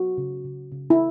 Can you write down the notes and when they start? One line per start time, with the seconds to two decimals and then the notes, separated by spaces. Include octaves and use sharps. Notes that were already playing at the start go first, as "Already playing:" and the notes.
Already playing: F#3 F#4
0.18 C#3
0.45 C#3
0.72 C#3
0.90 E4